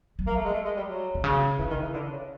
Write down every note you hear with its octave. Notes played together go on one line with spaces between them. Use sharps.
F#3
A#3
A3
G#3
A3
G#3
G3
F#3
C3
C#3
C#3 E3
D#3
E3
D3
C#3